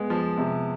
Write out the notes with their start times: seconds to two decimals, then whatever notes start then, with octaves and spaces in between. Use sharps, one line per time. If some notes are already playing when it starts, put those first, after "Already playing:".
Already playing: G#3 B3
0.10 F3
0.37 C3